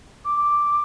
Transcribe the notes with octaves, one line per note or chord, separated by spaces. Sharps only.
D6